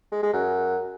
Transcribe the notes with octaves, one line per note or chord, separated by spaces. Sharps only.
G#3
G#3
F#2